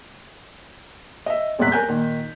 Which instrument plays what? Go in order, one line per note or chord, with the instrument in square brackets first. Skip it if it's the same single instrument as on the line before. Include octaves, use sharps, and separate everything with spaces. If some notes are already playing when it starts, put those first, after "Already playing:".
[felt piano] D#5 E5
D#1 G#1 E2 E5 F#6 B6
A#4 G#5 G6
A#2 D#3